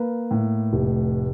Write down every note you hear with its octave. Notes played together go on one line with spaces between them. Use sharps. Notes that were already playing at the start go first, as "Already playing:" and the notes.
Already playing: A#3 B4
A2
F1